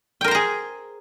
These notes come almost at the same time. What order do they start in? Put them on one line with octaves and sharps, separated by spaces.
G5 A#4 C5 A#5 G#4